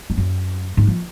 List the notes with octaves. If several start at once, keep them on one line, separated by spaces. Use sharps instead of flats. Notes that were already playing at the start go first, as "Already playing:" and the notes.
F2
F#2
G#2
F3